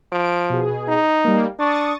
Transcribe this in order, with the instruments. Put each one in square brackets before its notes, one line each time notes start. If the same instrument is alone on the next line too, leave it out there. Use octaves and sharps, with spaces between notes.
[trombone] F3 [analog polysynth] D7
[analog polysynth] B2 G#4
[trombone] D#4
[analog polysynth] G3 A#3
[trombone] D4 [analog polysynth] C#6 D#6 A6